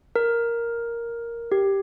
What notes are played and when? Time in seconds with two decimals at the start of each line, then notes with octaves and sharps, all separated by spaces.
0.16 A#4
1.52 G4